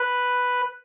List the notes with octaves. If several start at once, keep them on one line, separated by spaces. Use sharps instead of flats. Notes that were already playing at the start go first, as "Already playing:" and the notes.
Already playing: B4